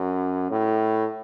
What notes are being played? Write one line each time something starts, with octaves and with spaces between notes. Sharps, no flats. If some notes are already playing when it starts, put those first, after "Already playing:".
Already playing: F#2
A2